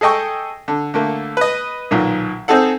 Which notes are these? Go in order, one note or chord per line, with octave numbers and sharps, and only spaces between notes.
G#4 A4 D#5 G5 C#6
D3
D3 A3 A#3
B4 D#5
B1 A#2 D#3
C4 D#4 G#4 A4 F#5